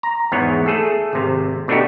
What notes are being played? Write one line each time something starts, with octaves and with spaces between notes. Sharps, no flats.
A#5
E2 G#2 B3 C#5
A3 G#4 A4
G#1 C3
B2 A3 D4 D#4 F#4 G4